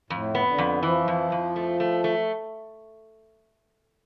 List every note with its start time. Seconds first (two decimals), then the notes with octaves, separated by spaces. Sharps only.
0.10 F2 A2
0.35 B3
0.46 D3
0.58 F2
0.83 E3 F3
1.08 F2
1.32 F2
1.56 A3
1.80 A3
2.04 A3